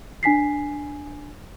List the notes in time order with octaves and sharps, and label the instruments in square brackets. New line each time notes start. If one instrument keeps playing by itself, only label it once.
[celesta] D4 G#5 B6 C7